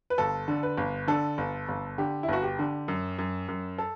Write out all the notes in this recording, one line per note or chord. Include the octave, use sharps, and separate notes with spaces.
B4
G1 A4
D3
B4
G1
D3 A4
G1
G1
D3 G4
E4
G1 F#4
G4
D3
F#2
F#2
F#2
A4